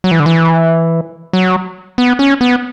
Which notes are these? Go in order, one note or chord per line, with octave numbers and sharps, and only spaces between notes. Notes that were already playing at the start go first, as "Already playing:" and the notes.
F#3
E3
D3
E3
F#3
B3
C#4
B3